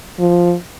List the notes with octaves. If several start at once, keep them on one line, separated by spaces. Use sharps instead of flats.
F3